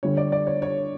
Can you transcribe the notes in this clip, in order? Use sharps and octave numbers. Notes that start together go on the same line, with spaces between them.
D2 D3 G3 C#5
D5
D5
C#5
C#5